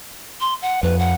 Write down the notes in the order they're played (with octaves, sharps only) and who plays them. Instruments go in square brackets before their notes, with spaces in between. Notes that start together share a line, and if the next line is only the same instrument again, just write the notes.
[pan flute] C6
F#5
[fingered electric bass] F2 [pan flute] B4
[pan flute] F#5